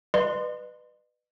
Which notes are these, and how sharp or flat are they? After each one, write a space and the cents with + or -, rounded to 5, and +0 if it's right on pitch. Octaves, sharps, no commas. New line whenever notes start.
B4 +0 D#5 -45 C6 -10